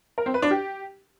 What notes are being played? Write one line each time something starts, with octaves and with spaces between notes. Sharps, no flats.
A#4
C4
B4
D4
G4